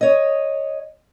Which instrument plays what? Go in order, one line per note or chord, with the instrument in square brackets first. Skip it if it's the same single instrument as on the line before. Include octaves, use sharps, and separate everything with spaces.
[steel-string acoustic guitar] C#5 D#5